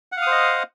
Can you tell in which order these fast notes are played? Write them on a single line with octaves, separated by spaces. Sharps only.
F#5 F5 D#6 C5 D#5